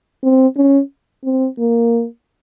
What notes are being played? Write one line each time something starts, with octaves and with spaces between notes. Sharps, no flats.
C4
C#4
C4
A#3